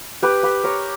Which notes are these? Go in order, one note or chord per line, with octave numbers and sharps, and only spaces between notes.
G4 B4
G4 B4
A#4 C#5